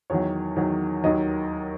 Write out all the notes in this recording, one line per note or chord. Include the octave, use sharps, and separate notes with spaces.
E2 D#3 F#3 C#5
E2 D#3 F#3
D#2 D#3 F#3 D#5